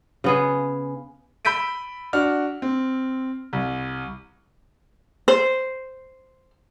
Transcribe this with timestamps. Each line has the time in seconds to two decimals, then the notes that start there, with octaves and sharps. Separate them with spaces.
0.24 C#3 B3 G#4
1.45 B5 E6 G6 B6 D7 D#7
2.13 D4 F#4 F6
2.62 C4
3.53 C2
5.28 C5